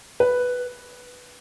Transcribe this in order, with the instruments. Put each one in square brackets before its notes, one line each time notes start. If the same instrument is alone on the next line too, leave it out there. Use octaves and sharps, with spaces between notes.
[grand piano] B4